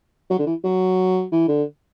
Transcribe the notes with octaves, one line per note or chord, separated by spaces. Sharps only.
F#3
D3
E3
F#3
E3
D3